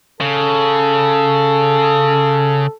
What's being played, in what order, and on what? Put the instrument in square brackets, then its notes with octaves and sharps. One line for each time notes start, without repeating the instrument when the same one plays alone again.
[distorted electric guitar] C#3 [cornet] A4